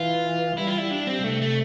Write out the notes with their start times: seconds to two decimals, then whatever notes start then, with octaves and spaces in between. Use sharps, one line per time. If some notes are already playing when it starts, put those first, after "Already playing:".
Already playing: E3 F4
0.57 G3 E4
0.68 F4
0.78 E4
0.91 D4
1.07 C4
1.24 C3 A3
1.42 A3